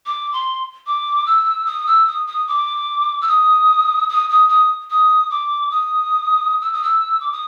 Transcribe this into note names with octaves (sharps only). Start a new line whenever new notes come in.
D6
C6
D6
E6
D#6
E6
D#6
D#6
D6
E6
D#6
D#6
D#6
D#6
D#6
D6
D#6
E6
D#6
E6
D6
D#6